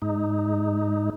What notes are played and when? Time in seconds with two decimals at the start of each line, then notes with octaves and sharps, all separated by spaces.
0.02 G#2 D#4